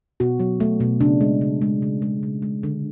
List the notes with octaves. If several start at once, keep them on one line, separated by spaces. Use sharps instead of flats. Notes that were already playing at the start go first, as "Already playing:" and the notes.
B2 F#4
F#3
A3
B2
C#3 D4
G#3
C#3
G#3
C#3
G#3
C#3
G#3
D3